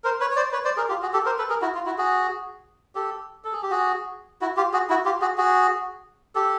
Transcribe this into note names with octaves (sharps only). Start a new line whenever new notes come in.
A#4 C5
B4 C#5
C#5
C5 D5
B4 C#5
C5 D5
G#4 A#4
F4 G4
F#4 G#4
G4 A4
A#4 C5
A4 B4
G#4 A#4
E4 F#4
F4
E4 F#4
F#4 G#4
G4 A4
A4
G#4
G4
F#4 G#4
E4 F#4
F4 G4
F#4 G#4
E4 F#4
F4 G4
F#4 G#4
F#4 G#4
G4 A4